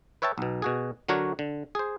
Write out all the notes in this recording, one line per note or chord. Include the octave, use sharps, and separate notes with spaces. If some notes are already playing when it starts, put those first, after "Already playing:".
B4 C#5 E5 G5 A5
B1 B2
B2 F#4 G#4
D3 F#3 D4 F#4 A#4 C#5
D3
G#4 C5